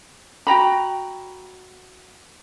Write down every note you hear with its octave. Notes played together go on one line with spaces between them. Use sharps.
F#4 G5 A#5 B5